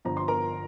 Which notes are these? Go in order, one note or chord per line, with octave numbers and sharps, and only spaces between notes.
G1 G2 F3 A#5
C6
A#4 A#5